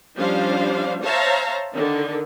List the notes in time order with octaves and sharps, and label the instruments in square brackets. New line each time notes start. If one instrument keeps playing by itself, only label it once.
[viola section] F3 G3 C#4 D4 C5 F5
C5 C#5 E5 F5 A5 A#5
D3 D#3